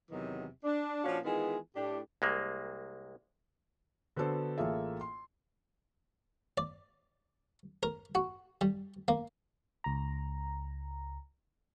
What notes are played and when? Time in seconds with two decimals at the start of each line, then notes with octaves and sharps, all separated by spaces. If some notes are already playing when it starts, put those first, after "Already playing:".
0.10 E2 C3 D#3 E3 F#3
0.64 D4
1.03 A#2 F3 C#4 D4 F#4 F5
1.24 D#3 E3 G#3 B3 F4 G#4
1.75 A2 D4 G4
2.22 C2 G#3 A#3
4.16 D3 B3 F#4 A4 C5
4.58 A1 A#3 F4 G#4 A4 E5
5.01 C6
6.58 D5
7.83 A#4
8.15 F#4
8.61 G3
9.08 A#3
9.84 C#2 A#5